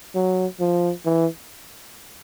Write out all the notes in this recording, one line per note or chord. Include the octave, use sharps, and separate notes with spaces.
F#3
F3
E3